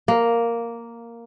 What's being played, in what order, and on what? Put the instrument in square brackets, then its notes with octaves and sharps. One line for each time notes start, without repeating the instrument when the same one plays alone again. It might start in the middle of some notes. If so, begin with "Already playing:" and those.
[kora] A#3